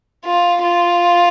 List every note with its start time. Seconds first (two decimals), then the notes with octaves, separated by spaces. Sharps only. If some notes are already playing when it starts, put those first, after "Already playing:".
0.25 F4
0.63 F4